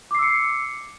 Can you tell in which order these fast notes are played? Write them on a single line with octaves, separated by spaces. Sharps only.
D6 C7 E6 C#7